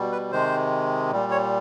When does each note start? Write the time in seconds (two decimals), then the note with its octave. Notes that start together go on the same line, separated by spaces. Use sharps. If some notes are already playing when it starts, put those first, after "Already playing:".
Already playing: B2 G3
0.12 B4
0.32 C3 D#3 G#3 C5
1.12 A#2 G3
1.31 C#5